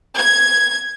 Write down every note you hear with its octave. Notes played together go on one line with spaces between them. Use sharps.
G#6